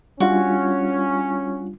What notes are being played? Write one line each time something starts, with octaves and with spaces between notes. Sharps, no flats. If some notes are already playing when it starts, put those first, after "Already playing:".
G3 C#4 D4 F4 F#4